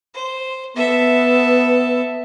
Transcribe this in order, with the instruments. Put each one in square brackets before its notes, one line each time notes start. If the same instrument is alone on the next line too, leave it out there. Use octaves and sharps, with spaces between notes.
[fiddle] C5
[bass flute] B3 [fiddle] A4 E5